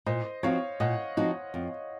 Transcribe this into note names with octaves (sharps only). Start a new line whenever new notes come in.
A#2 C5 D#5
F3 C4 D#4 F#4 C#5 F5
A#2 D#5 F#5
F3 C4 D#4 F#4
F2